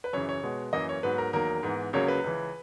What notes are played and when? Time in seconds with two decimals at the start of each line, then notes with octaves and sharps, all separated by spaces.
0.04 B4
0.13 F#2 C#3 E3 C#5
0.29 C#5
0.43 B2 G#3 B3
0.73 F#2 E3 A#3 D#5
0.89 C#5
1.03 G#2 F#3 B3 B4
1.18 A#4
1.33 E2 D#3 F#3 A#3 A#4
1.63 G#2 E3 B3
1.93 C#2 C#3 F#3 A#3 C#5
2.08 B4
2.24 C#2 C#3 E3